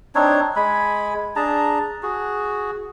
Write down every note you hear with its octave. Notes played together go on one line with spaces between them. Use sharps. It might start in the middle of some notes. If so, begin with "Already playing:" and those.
C4 D4 D#4 C#5
G#3 G#5 B5
D4 G#4 A5 A#5
F#4 G#4